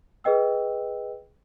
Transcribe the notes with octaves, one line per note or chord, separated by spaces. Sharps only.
G#4 B4 D#5 G5 E6